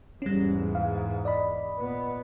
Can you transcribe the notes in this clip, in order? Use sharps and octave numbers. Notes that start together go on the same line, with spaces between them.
E2 G#2 G3 C#4
F5
D5 D#5 B5
A#2 B3